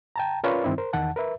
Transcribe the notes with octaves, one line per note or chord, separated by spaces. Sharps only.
G5 A5 A#5
C#4 F4 A#4 B4 C#5 D5
G2 D#3 C4 D#4 E4
A#4 C5
E2 D#3 F#5 A5
A#4 B4 E5